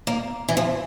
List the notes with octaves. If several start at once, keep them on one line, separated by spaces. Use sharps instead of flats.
A#3
E3
F3